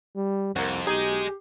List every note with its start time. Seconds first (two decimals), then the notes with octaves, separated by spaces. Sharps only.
0.16 G3
0.56 C2 F2 A#3 F#4
0.87 B1 D#4 G4 G#4 D#5